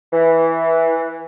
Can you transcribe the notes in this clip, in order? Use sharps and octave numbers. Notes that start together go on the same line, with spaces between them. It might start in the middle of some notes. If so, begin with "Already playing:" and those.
E3